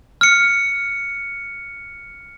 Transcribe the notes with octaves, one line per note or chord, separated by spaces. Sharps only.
F6 C#7